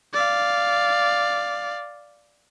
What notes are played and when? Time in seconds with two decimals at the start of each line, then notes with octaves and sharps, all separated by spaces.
0.14 D5 F5